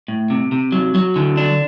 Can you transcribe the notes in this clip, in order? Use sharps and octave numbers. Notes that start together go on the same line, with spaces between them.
A2
C3
C3
F#3
F#3
D3
D4